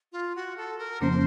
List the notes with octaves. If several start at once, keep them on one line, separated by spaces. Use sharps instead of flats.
F4
F#4
A4
A#4
F2 C#3 F3 A#3 C#4 C5